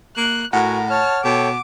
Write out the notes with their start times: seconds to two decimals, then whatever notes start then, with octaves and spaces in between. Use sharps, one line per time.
0.17 A#3 F#6
0.53 A2 F#4 A#4 F#5 G#5
0.90 C#5 A5 F6
1.24 B2 A4 C#5 G5 D6